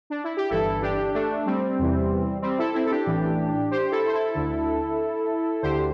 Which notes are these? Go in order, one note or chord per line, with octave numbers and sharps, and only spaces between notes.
D4
E4
G4
G1 G2 E3 E4 A4
D4 G4
A3 D4
G3 C4
E2 C3 E3
G3 C4
E4 A4
C4 E4
A4
D4 G4
A1 A2 E3
G4 C5
E4 A4
C5
E4 A4
D2 D3
D2 D3 G4 C5